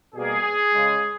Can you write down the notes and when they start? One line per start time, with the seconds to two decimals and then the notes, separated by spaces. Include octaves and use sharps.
0.13 B2 G3 A#3 G#4
0.74 C#3 G#3